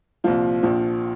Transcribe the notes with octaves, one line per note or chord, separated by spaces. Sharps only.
C2 A#2 F3 F4
A#1 A#2 F3